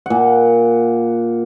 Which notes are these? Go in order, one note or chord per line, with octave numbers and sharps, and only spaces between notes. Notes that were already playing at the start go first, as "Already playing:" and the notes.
A#2 F#5